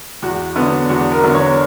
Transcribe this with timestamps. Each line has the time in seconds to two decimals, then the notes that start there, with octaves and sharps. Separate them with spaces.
0.22 E2 F#4
0.56 D3 F#3 B3
0.89 E2 F#4
1.12 A#4
1.23 D3 F#3 B3
1.34 C#5